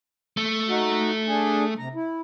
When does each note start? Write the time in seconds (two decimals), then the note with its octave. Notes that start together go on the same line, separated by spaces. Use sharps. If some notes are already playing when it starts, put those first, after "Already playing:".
0.37 A3
0.69 D#4 F#4
1.27 D4 G#4
1.79 C3 A#5
1.95 E4